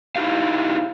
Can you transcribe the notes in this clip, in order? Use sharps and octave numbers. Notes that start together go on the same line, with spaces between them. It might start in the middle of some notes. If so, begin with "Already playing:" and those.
D#4 E4 G4 F5